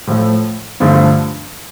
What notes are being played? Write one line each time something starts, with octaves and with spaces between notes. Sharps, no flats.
A2 F3 A3
G2 D3 F3 A3